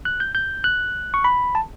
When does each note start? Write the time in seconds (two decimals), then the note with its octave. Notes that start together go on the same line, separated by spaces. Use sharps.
0.05 F#6
0.20 G6
0.35 G6
0.64 F#6
1.14 C#6
1.24 B5
1.55 A5